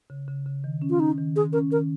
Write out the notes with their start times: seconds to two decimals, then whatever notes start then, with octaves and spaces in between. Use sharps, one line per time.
0.10 C#3
0.28 C#3
0.46 C#3
0.64 D#3
0.82 C#4
0.90 F4
0.99 C#4 D#4
1.18 D#3
1.36 D#3 G#4
1.53 C#4 A#4
1.71 D#3 A#4